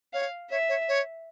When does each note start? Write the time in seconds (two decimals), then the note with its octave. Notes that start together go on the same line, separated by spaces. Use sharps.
0.13 C#5 F5
0.50 C#5 E5
0.69 C#5
0.88 C#5